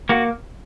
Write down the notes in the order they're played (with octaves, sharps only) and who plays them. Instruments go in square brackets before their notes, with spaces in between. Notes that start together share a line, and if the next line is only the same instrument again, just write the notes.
[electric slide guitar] A#3 F#4